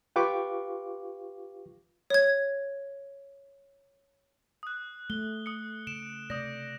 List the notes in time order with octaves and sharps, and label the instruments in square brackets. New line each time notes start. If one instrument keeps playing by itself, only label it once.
[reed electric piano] F4 G4 B4 F5 C#6 D6
[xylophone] C#5 G#6
[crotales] D#6 F#6
[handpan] A3 [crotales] G7
[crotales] D#6 C#7
[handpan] C#3 [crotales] D7 E7
[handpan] C3 A3 D5 [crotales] D#6 G6 A#6